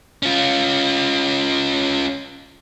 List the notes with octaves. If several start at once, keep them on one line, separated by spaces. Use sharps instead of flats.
C#4 F4